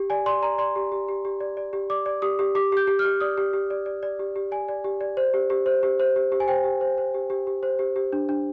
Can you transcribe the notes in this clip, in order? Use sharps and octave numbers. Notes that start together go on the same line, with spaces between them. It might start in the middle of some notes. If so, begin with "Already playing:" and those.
Already playing: G4
D5 G#5
D5 C6
D5 A#5
D5 C6
G4
G4
G4
G4
D5
D5
G4
D5 D6
D5
G4 D#6
G4
G4 D6
G4 G6
G4
F6
G4
D5 D#6
G4
G4
D5
D5
D5
G4
G4
D5 G#5
D5
G4
D5
C5
G4
G4
C5
G4
C5
G4
G4
G#5
C5 G5
G4
C5
C5
G4
G4
G4
C5
G4
G4
D4
D4